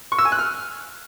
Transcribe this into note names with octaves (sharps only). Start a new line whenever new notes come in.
C#6
E6
G#5
F#6
F6